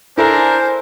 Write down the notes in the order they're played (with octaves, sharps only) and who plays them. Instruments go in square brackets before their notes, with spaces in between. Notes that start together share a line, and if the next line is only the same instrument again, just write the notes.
[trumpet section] D4 A#4 [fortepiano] E4 A4 [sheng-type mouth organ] C5 [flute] G#5